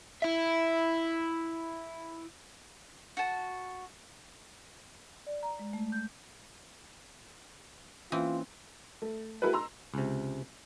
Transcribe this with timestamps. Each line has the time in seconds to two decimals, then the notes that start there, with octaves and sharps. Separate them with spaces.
0.22 E4 E5
3.17 F#4 A5
5.27 D5
5.43 A#5
5.59 G#3
5.73 A3
5.92 G6
8.12 E3 A#3 C4 C#4 F4
9.02 A3
9.42 A3 E4 F#4 G#4 A#4 B4
9.53 A#5 C6 E6
9.94 C#2 C3